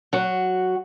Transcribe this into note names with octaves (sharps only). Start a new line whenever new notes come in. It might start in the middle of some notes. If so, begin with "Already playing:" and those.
F#3 F#4